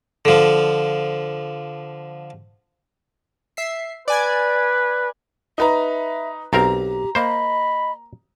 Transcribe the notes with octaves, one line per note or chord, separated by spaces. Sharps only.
D3 F3
E5 C7
B4 D5 G#5 G#6
D#4 B4 E5 A#5
B1 C4 G4 A#4 A#5
A#3 C5 D#5 B5